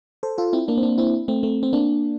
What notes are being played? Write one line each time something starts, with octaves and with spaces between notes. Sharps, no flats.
A4 C5
F4 A4
C4 E4
A#3 D4
C4
A#3 D4
C4 E4
A3 C4
A3 C4
C4
A#3 D4